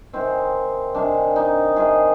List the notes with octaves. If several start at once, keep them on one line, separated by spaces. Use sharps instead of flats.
C3 D#3 G#3 C4
C3 D#3 G#3 D4
D#4
C3 D#3 G#3 G#4